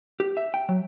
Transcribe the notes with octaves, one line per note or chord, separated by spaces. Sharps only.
G4
E5
G5
F#3